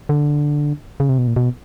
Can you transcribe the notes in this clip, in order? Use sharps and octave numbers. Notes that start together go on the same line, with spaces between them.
D3
C#3
C3
B2
A#2
B2